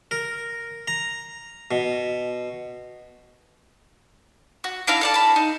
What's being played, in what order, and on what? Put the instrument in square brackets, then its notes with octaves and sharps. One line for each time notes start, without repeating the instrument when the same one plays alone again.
[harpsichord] A#4
A#5
B2
[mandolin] F#4
D4 E4 F5 A#5
A4 D5 A5
A5 B5
D#4